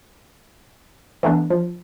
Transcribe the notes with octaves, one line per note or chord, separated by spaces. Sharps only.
E3 A3 B3 D4
F3